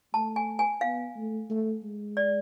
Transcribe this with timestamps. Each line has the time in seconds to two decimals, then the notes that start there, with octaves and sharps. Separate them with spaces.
0.14 A3 A5
0.36 G#5
0.59 G#5
0.81 B3 F5
1.16 A3
1.50 A3
1.83 G#3
2.17 D5